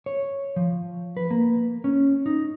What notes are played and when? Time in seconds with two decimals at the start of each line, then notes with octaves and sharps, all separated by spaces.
0.06 C#5
0.56 F3
1.17 B4
1.31 A#3
1.84 C#4
2.26 D#4